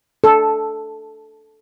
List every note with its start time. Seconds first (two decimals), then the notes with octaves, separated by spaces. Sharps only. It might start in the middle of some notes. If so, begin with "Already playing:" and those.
0.24 A4